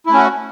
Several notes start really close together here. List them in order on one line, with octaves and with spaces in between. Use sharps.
E4 A3 C#4 F#4